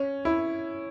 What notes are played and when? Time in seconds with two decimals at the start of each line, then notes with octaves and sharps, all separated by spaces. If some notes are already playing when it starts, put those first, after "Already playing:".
Already playing: C#4
0.25 E4